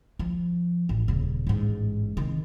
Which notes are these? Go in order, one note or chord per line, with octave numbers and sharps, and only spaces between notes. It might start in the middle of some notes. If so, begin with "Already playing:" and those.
F3
A1
D#1 C#3
A1 G#2
C3 D#3